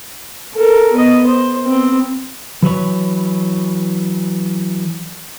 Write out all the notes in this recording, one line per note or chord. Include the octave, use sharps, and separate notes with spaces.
A4 A#4
B3 D#5
C5
B3 C4
E3 F#3 B4 C#5